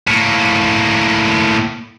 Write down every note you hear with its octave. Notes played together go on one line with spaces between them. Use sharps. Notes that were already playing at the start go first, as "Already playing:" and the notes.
A2 A#3